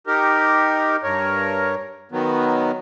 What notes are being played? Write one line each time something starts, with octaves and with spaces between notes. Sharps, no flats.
D#4 G4 A#4
G2 A#4 C#5
D#3 F#3 B3